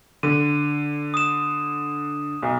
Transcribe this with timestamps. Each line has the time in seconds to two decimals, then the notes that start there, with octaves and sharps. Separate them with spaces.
0.23 D3 D#7
1.14 D#6 E7
2.42 B1